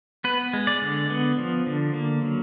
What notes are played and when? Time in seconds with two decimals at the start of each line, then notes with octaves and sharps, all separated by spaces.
0.24 B3 B4
0.53 G#3
0.67 D5
0.82 D3
1.10 B3
1.38 F3
1.66 D3
1.94 A#3
2.22 F#3